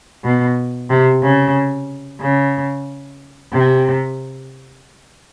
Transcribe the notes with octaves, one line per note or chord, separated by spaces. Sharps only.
B2
C3
C#3
C#3
C3